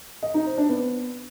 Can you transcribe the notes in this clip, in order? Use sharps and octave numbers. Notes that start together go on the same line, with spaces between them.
D#5
D#4
C5
D4
B3